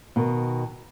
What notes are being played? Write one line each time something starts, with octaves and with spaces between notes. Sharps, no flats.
B2 D#3